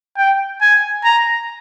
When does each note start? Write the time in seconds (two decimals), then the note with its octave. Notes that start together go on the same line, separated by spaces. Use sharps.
0.17 G5
0.61 G#5
1.04 A#5